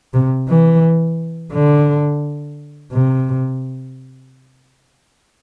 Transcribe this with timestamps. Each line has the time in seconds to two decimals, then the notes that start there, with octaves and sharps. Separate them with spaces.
0.14 C3
0.49 E3
1.53 D3
2.92 C3